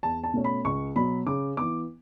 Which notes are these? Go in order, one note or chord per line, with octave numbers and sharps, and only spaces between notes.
E2 A5
A5
B2 A3 C#4
B5
C#2 C#6
B2 F#3 B5
C#3 D6
E3 B3 D6